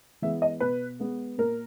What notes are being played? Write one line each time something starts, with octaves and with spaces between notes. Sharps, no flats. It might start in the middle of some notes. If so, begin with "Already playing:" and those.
E3 G#3 B3 E5
D#5
B2 B4
G#3 B3
A#2 A#4